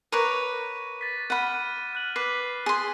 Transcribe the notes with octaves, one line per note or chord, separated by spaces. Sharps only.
A#4 B4 C#5 D6 D#7
A6 B6
F#5 B5 F6 D#7
F6 F#6 F#7
B4 D6 B6 C7
G#4 C6